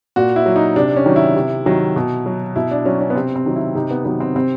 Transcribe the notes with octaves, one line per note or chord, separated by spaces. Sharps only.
A#2 F#4
E4
F#3
D#4
C3 D4
C#4
D#3 F#3
E4
C3
D#3 F#3
B2
F#3
B2 E4
D4
F#3 C#4
C#4
B3
C3 C4
C4
D#3 F#3
E4
C3 D#4
B3
D#3 F#3 B3
C4
C3 C4